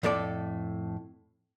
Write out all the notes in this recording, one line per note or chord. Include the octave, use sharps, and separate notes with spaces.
F2 A2 A4 D5